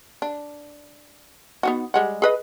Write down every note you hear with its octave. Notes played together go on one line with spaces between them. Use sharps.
D4
B3 D#4 F#4
G3 G#3 F#5
G#4 B4 D#5